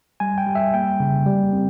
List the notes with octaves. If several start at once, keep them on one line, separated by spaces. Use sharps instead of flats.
G3 G#5
G5
G3
E5
A#3 G5
C#3
G3
C4